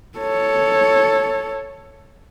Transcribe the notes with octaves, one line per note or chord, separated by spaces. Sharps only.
A4 C#5